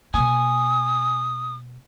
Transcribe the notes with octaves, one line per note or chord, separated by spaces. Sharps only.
B2 A#3 G#5 D#6